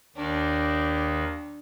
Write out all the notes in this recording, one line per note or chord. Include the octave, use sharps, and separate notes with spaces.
D#2 D#3 D4